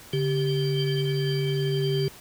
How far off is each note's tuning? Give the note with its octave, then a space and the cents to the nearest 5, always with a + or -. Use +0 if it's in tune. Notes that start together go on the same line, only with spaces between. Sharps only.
D3 -40 G4 +0